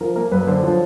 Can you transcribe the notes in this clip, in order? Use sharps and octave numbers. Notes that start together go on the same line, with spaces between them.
F3 A#4
A#3 A#4
F#2 B4
D3 C5
F3 C#5